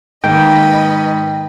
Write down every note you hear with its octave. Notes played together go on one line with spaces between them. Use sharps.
G#2 D#3 A#3 B4 D#5 G5